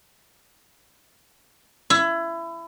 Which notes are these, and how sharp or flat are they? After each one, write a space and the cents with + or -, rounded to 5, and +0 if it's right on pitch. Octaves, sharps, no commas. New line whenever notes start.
E4 +25